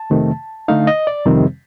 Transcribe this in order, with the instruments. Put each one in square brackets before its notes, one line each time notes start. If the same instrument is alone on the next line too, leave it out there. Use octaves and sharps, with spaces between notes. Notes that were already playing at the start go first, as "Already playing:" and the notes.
Already playing: [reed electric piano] A5
F2 C3 D#3 A3
D3 A3 D#4 F5
D#5
D5
F2 C3 D#3 G3 C4